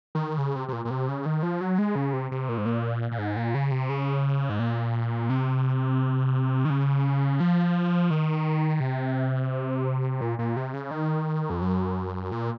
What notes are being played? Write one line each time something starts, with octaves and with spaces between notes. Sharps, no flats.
D#3
C#3
C3
C3
A#2
A#2
C3
C#3
D#3
F3
F#3
G#3
C#3
C3
C3
A#2
G#2
A#2
A#2
G#2
A#2
C#3
C3
C#3
G#2
A#2
C3
D#3
C#3
F3
D#3
C3
A#2
A#2
C3
C#3
D#3
F2
F#2
A#2